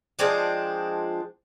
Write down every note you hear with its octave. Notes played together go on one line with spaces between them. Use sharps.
F3 G#3 C4 D4